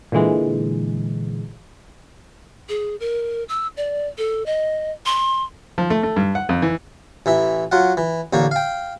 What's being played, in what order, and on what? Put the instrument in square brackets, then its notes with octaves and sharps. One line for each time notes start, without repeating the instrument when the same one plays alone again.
[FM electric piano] A#2 D3 E3 G#3
[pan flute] G#4
A#4
E6
D5
A4
D#5
C6
[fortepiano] F3
A3
A3
G2
F#5
F2
E3
[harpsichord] A1 E3 E5
F#3 F4 F#5
E3
A1 D3 A#3 C#5
F5 G5